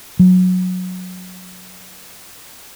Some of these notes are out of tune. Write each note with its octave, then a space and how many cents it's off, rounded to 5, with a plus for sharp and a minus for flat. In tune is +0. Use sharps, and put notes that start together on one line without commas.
F#3 -15